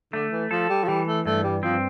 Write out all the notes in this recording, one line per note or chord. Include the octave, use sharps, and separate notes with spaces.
D3 A3
E3
F3 A4
G3
F3
E3 G3
A3
G2 A3
G3
F3 C4